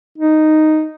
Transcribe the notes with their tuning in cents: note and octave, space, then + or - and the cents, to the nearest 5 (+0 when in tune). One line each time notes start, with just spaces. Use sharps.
D#4 -5